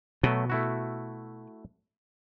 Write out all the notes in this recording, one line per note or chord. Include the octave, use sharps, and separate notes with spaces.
B2 F#3 A3
A3 E4 F#4